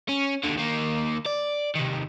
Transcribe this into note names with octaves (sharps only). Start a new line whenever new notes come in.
C#4
D#2 D3
D#3 A#3
D5
C3 D#3